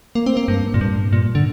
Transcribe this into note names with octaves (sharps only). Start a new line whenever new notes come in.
A#3
C4
A#3
G2
A#2
G2
A#2
D3